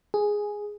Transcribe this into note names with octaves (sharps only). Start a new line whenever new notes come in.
G#4